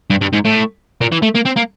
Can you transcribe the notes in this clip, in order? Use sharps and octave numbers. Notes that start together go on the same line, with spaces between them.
G2
G2
G#2
A2
A#2
E3
A3
A#3
C4
A#3